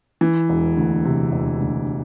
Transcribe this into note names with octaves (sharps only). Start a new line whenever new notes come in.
E3
E1
D2
C3
E1
D2